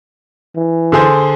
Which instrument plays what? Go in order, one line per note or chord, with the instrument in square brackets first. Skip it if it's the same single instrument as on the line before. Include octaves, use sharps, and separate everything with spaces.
[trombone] E3
[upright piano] D3 G#4 C5